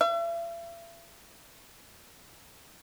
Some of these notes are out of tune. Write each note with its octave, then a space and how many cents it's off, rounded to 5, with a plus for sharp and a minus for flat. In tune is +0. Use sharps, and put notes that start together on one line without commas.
E5 +45